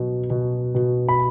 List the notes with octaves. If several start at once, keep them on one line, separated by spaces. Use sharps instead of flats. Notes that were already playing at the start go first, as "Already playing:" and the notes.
Already playing: B2 F#3
B2
B2
B5